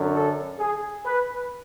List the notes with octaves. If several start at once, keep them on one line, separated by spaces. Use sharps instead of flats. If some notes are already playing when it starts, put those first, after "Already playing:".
Already playing: F#2 D3
A4
G#4
B4